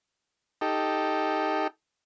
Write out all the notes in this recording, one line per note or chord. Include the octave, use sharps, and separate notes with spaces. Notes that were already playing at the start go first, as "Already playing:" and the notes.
D#4 G4 A4